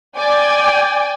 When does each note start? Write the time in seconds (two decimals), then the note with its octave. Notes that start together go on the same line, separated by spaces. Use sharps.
0.17 D5 G5 G#5